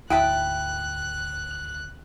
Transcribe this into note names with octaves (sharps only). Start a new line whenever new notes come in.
D2 G#2 E4 F#5 G5 A5 B5 F#6